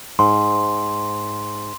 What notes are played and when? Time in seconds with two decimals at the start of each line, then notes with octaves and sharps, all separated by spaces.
0.19 G#2 C6